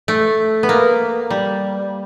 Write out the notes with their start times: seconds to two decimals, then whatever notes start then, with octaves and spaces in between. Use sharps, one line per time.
0.08 A3
0.63 B3
0.69 A#3
1.30 G3